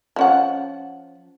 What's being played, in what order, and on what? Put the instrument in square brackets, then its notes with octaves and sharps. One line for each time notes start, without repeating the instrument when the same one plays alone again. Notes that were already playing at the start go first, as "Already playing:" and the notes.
[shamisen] F3 C#4 F#5